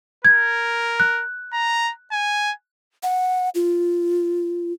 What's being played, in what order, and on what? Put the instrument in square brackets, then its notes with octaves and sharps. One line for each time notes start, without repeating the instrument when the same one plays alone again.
[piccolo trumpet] A#4 [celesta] G#6
[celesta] F#6
[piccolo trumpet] A#5
G#5
[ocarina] F#5
F4